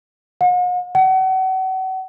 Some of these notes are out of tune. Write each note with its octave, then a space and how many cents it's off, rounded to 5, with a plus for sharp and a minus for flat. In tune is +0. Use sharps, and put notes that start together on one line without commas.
F#5 -45
F#5 +35